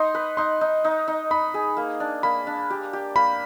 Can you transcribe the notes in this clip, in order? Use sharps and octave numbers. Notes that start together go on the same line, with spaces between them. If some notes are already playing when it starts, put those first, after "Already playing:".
Already playing: D#4 C6
B4
D#4 C6
D#4
D#4
D#4
D#4 B5
G#4
A#3
D4
A#3 B5
D4
G4
G4
A#3 B5